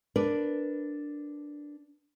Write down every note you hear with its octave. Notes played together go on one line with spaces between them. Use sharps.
D4 A#4 B4 D5